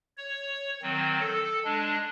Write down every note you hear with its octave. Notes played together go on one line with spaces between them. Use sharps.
C#5
D#3 F#3 C4
A4
G#3 D4